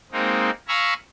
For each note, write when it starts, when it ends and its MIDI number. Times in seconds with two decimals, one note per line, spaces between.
0.12 0.50 56
0.12 0.50 58
0.12 0.50 60
0.12 0.50 63
0.68 0.94 77
0.68 0.94 80
0.68 0.94 82
0.68 0.94 83
0.68 0.94 85
0.68 0.94 88